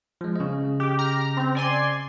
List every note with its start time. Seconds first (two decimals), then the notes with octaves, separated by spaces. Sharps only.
0.21 F3 G#3
0.36 C#3 D#5
0.80 G4
0.99 A#5 F6
1.37 C4
1.55 D5 G#5 C6